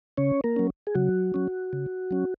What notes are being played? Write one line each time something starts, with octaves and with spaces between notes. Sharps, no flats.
C#3 C#4 C#5
A#3 A#4
F#3 C#4
G#4
C#3 F#3 F#4
F#3 C#4
C#3
F#3 C#4